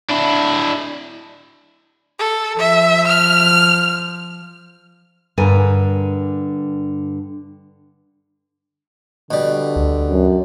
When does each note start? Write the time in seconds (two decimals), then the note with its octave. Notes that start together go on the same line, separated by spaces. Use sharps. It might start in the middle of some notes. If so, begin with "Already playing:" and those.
0.10 D4 E4
2.19 A4
2.59 F3 E5
3.07 F6
5.38 G2 D3 A#4 G#5
9.31 B2 D3 G3
9.76 D2
10.11 F#2